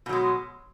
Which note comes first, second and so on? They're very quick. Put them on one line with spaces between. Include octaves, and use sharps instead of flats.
B2 F#3 G#3